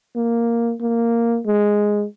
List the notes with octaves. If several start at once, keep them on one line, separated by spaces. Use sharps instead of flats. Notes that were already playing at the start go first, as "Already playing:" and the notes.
A#3
A#3
G#3